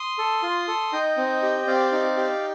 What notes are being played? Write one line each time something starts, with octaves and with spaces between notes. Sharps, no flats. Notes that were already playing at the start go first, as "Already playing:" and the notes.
Already playing: C6 D#6
A4
F4
A4
D#4 D#5 G5
C4
G4
C4 D5 F5
D#4
G4